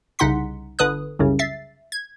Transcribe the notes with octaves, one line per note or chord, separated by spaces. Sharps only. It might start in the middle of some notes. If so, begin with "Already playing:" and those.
C2 C#3 D#4 F#5 C6 B6
G1 D3 B4 D#6 F#6
C2 F#2 C#3
E5 A6 C7
G#6